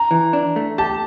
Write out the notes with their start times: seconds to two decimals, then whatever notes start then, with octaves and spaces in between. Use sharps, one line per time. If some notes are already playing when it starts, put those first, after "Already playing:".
Already playing: A#5
0.11 E3
0.33 D4
0.56 A3
0.78 G4 A5